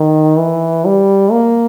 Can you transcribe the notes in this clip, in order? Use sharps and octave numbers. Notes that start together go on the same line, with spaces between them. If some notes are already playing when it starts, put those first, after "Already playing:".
Already playing: D#3
E3
G3
A#3